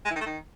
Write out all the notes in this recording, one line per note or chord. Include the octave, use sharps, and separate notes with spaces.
G#3
E3
D#3
A3
D#3